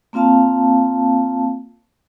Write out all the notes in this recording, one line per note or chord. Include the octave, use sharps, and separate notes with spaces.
A#3 C4 F4 F5 A5